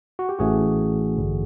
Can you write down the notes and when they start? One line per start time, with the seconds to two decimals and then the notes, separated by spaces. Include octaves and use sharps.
0.19 F#4
0.29 G4
0.39 A1 A2 E3 A3 C#4 F#4 G#4
1.18 A1 G2 D3